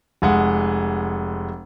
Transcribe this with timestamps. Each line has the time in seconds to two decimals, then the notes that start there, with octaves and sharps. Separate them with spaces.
0.22 F1 G#3 F#5